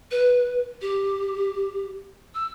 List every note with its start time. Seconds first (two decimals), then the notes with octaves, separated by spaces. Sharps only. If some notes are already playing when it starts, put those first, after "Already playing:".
0.11 B4
0.82 G4
2.35 E6